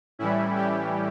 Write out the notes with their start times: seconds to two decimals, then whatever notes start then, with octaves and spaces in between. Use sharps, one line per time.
0.19 A2 E3 G3 C#4 E4
0.55 E4 G4